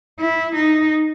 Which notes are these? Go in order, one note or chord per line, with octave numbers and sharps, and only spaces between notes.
E4
D#4